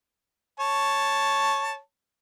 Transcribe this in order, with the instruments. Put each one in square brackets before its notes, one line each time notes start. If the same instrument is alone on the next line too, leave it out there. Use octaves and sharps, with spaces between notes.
[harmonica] C#5 A5